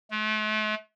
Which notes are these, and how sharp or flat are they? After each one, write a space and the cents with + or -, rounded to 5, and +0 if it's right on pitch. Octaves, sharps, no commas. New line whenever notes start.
A3 -40